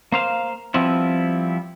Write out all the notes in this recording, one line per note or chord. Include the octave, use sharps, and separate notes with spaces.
A#3 C5 F5
F3 G3 B3 C4 E4